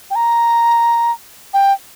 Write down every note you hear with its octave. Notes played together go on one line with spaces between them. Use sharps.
G5
A#5
G5